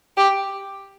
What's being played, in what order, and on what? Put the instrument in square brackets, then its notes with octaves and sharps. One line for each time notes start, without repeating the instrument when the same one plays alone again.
[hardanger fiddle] G4